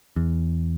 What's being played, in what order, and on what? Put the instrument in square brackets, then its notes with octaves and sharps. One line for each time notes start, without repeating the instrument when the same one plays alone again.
[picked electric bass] E2